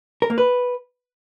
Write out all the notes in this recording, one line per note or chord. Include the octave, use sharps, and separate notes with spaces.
A#4
A#3
B4